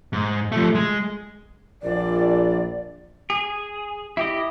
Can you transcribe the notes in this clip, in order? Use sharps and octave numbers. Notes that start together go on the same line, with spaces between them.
G#2
F3 A3
G#3
A#1 D5
G#4
E4 G4 D#5